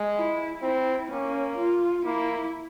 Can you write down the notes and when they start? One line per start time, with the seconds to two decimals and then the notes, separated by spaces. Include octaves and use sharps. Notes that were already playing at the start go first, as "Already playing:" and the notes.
Already playing: G#3
0.16 E4
0.63 C4 E4
1.11 A#3 C#4
1.58 F4
2.06 A#3 E4